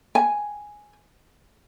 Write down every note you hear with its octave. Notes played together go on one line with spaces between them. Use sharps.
G#5